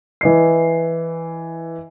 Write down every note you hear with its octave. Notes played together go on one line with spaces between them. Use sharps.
E3 D#5 C7